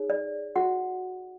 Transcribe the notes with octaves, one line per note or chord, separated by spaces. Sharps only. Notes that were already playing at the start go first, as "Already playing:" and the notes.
Already playing: D#4 G#4 C#5
D5
F#4 F#5